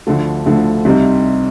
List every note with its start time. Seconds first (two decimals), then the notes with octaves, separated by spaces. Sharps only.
0.07 D2 D3 F3 A3
0.46 D2 D3 F3 A3
0.85 C2 C3 G3 C4 D#4